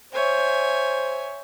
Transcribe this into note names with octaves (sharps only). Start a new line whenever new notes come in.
C5 C#5 E5 G#5